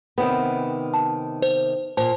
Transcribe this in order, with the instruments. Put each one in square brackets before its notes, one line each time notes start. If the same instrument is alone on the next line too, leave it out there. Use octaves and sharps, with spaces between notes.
[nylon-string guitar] C3 D#3 B3
[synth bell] A5
C5
[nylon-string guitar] A#2 [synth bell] C5 A5